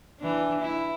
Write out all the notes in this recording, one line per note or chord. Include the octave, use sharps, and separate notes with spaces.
E3 D4
E4